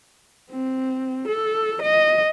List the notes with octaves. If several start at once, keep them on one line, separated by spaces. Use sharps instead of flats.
C4
A4
D#5